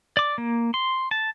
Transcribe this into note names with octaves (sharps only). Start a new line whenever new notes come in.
D5 D6
A#3
C6
A5